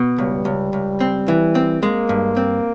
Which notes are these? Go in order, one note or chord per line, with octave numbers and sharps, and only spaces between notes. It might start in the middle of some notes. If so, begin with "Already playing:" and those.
Already playing: B2
C#2 G3
C#2
C#2
C4
E3
C4
G#3 A#3
G2
C4